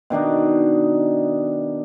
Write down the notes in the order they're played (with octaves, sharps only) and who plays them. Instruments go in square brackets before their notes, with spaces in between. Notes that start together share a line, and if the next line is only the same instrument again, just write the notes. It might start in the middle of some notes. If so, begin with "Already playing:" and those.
[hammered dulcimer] B2 D#3 D4 D#4